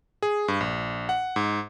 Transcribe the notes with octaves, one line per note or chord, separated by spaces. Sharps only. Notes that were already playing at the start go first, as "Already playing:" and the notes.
G#4
G2
A#1
F#5
G#2